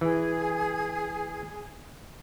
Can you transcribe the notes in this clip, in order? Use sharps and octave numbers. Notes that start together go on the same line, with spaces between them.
E3 G#4